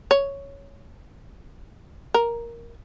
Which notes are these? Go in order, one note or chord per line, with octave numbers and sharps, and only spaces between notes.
C#5
A#4